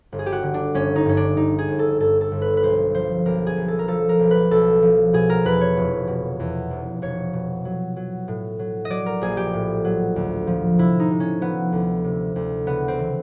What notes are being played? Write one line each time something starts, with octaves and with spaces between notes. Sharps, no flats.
G1
G#4
G4
F#4
D3
D4
G1 C#4
D#4
G2 C#4
D4
G2 D#4
G#4
G1
A4
G2 A4
A4
G1
B4
B4
B1 C5
F3 C5
B1 A#4
G#4
B1
A4
A#4
F3 A4
A#4
B1
B4
B1 A4
F3
B2 G#4
A#4
E2 B4
C#5
F1
B2
E2
F1
F1 C#5
B2
F#3
F#3
A2
F#3
D#5
F#3 D5
A#4
A#1 G#4
G4
A2
F#3
D2
F3
C3 E4
D#4
C3
C#4
F3 B3
D2
C3
D2
C#3 B3
C4
E3